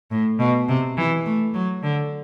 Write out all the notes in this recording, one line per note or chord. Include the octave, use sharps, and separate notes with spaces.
A2
B2
C3
E3
A3
F#3
D3